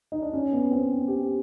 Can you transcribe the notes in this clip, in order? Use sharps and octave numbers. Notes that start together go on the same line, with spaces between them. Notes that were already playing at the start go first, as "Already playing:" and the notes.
D#4
D4
C#4
B3
C4
G4